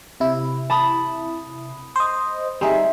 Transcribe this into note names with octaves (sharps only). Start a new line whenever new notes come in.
C3 E4
A5 B5 D#6
C5 D#5
G3 C4 D#4 G#4 E5